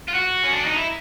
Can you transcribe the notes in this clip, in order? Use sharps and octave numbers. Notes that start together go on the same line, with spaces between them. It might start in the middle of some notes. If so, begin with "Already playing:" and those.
F4
F#4
C#4
D4
D#4
E4